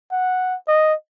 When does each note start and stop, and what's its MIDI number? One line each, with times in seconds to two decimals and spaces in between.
0.12 0.56 78
0.68 0.94 75